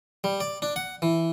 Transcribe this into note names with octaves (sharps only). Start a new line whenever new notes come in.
G3
D5
D4
F#5
E3